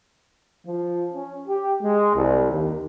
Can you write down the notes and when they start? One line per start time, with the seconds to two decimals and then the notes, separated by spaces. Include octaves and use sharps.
0.67 F3
1.14 C#4
1.48 G4
1.83 G#3
2.16 C2
2.52 D#2